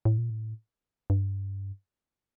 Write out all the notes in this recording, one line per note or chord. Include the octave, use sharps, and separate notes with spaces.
A2
A#2
A2
G2